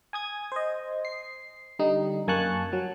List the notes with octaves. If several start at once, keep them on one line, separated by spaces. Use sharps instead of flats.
G#5 D#6 G#6
C5 D#5
C7
D3 G3 D#4
F#2 A#3 G#5 A5 C#6 F#6
F#3